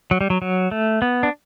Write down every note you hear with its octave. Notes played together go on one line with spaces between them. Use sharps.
F#3
G3
F#3
F#3
A3
B3
D4